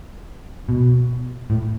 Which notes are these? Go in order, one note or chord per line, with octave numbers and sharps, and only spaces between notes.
B2
A2